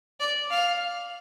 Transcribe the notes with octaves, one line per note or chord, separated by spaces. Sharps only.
D5
F5